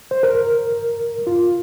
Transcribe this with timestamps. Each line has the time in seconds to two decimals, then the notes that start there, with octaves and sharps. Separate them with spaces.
0.11 C5
0.23 A#4
1.27 F4